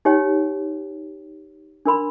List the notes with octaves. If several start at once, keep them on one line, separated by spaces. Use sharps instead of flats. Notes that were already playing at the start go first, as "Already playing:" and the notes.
D#4 G4 C#5 G5
D4 A#4 B5 C6